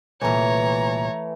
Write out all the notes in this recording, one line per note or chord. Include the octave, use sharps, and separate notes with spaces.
C2 A#2 E3 A3 C#5 A#5